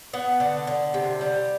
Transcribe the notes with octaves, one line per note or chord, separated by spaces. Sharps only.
B3 F#5
D3
D3
C3
G3